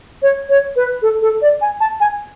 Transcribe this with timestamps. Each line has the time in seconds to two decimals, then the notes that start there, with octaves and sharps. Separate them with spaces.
0.22 C#5
0.49 C#5
0.76 B4
1.02 A4
1.22 A4
1.42 D5
1.61 G#5
1.80 A5
2.00 G#5